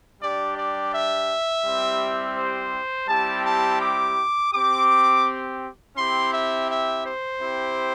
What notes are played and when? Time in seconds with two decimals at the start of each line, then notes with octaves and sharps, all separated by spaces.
0.20 G3 D4 G4 D5
0.56 D5
0.93 E5
1.64 G3 C4 E4 G4
2.37 C5
3.08 G3 C4 E4 G4 A5
3.44 A5
3.81 D6
4.53 C4 G4 D6
5.97 C4 E4 G4 C6
6.33 E5
6.69 E5
7.05 C5
7.40 C4 E4 G4